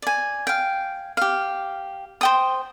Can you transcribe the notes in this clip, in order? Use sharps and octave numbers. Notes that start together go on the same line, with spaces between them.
D5 G#5
F5 G5
G4 F5
C5 G5 D#6